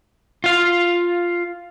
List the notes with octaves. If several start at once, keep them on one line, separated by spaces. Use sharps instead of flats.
F4 F5